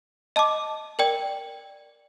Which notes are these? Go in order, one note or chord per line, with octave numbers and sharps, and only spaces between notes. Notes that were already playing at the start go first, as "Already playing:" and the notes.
D#5 A5 D6
A#4 D5 G5